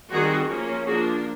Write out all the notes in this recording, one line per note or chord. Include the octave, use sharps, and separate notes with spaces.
D#3 G3 C4 F#4 G#4
F3 A#3 C#4
F3 A#3 D4 F#4 G#4